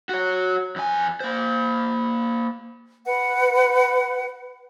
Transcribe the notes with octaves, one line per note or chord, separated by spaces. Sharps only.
F#4 C#5
F2 G#5
A#3 C5
B4 F#5